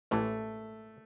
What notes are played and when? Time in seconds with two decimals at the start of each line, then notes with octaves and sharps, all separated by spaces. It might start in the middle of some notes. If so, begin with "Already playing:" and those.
0.11 A1 A2 E3 A3